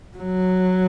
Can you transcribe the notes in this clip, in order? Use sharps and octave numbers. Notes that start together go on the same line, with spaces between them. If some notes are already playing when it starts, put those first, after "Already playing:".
F#3